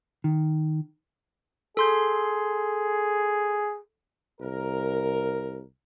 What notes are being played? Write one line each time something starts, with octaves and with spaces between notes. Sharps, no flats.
D#3
G#4 A4 C6 G6
C2 A#4